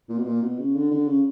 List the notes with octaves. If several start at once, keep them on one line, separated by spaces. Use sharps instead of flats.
A#2
B2
A#2
B2
C#3
D3
D3
C#3